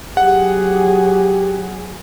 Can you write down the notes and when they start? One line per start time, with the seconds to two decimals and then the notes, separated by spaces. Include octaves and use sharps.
0.17 F#3 G4 G#4 F#5